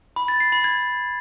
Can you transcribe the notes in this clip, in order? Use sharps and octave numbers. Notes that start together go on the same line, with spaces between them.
B5
A6
C7
B5
G#6